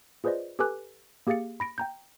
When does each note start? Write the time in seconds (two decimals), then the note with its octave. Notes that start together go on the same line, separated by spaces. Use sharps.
0.24 F4 G#4 B4 C5 D5 D#5
0.59 G4 A4 B4 G#5 D6 F#6
1.27 A#3 G4 G#4 F5 A6 C#7
1.60 B5 A#6 D7
1.78 G5 A#5 G6